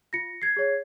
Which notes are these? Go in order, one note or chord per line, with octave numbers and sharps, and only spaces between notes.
F4 A#6 C#7
G#6 C7
G#4 C#5